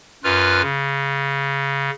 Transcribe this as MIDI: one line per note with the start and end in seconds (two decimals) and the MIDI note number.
0.24 0.62 42
0.24 0.62 65
0.24 0.62 71
0.24 0.62 89
0.62 1.90 49